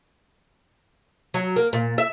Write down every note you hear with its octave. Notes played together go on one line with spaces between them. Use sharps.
F#3
A#3
A#2
E5